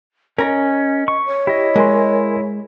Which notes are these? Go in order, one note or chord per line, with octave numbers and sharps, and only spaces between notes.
C#4 A#4 D#5 A#5
C#6
C#5
E4 G4 D#5
G#3 A#4 G#5 C6